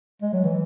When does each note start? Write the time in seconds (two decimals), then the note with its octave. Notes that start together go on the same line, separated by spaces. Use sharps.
0.22 G#3
0.33 F#3
0.44 E3